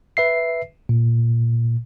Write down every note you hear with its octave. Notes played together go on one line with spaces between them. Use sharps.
B4 E5 C7
A#2